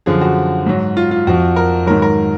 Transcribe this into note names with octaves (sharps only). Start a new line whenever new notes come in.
F#2 D3 F3 G#4
F#4
G#2 F#3
F4
F4
F2 F3 F#4
A#4
G#2 D#3 F#3 A#4
A#4